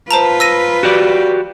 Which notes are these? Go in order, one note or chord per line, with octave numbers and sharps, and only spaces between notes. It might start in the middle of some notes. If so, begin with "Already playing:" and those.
F4 B4 C5 A5 A#5
E6 A#6 D#7
F#4 G4 D5